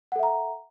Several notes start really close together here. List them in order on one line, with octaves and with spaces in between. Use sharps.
F#5 A4 E5 A#5